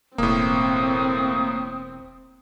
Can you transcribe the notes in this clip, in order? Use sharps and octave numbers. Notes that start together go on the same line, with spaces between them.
E1 A2 A#3 C4 D#6